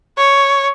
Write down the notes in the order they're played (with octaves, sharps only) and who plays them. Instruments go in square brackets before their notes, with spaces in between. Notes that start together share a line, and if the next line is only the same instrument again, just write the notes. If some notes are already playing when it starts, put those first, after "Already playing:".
[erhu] C#5